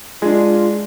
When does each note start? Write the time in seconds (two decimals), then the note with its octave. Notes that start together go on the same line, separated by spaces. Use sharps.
0.22 G#3 D4 F4